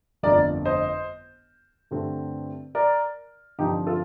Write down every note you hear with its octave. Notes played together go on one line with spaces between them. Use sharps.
G1 F2 D3 A3 A#4 D5
C5 D#5
G2 D3 A3 C4
A#4 D5
G2 D3 F3 C4 D#4 G4
F4 A4